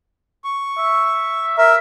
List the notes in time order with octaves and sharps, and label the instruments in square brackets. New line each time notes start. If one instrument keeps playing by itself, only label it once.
[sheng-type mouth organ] C#6
[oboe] E5
[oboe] A#4 [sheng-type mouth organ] E5